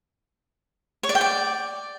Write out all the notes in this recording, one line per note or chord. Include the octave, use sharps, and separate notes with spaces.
C#5
D5
G5
D5